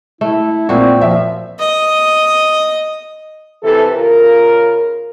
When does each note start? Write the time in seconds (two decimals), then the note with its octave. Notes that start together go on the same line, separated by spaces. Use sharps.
0.21 A3 E4
0.69 A#2 C4 F#4
1.01 F3 E5
1.59 D#5
3.63 C3 E3 A4
3.94 C#3 F4 A#4